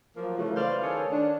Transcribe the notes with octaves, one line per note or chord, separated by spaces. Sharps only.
F3 F#3 A#3
C#3 E3 A3
B4 C5 D5 F5
D#3 G#4 A4 C#5
D4